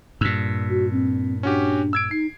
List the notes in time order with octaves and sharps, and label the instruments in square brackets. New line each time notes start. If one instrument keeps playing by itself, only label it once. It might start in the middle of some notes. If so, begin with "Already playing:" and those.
[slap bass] G2 A#2 [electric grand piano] E6 B6
[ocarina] F#4
C4
[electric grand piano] C#4 F#4 G4 [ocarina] D4
[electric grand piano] E6 G#6 D7
[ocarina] D#4 [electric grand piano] C7